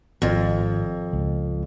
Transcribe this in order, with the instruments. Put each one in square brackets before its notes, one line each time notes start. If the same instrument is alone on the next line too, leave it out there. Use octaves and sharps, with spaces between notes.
[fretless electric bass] G#1 [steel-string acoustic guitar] F2
[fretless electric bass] C#2